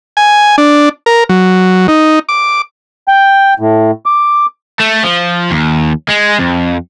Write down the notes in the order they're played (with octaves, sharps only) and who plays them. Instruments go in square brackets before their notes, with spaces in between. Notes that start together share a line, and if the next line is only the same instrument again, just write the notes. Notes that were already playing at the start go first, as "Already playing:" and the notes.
[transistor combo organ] G#5
D4
A#4
F#3
D#4
D6
[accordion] G5
A2
D6
[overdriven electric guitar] A3
F3
D#2
G#3
F2